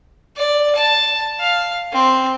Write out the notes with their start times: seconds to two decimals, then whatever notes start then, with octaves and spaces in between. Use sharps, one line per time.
0.37 D5
0.76 A5
1.40 F5
1.93 C4